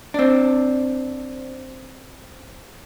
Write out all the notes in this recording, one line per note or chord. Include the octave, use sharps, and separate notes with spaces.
C4 D4